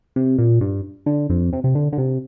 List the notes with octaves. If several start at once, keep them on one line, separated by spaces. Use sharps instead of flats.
C3
A#2
G2
D3
F2
C3
C3
D3
D3
C3